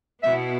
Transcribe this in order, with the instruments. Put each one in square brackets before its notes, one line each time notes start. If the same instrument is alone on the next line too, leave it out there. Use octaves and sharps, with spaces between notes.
[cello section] B2 B3 E4 [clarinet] E5